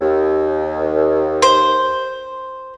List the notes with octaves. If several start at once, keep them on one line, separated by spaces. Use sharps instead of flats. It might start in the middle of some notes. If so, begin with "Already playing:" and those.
D#2
C5